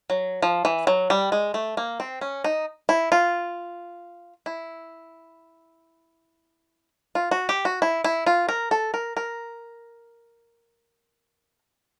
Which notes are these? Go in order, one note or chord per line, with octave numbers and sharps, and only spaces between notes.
F#3
F3
E3
F#3
G3
G#3
A3
A#3
C4
C#4
D#4
E4
F4
E4
F4
F#4
G4
F#4
E4
E4
F4
A#4
A4
A#4
A#4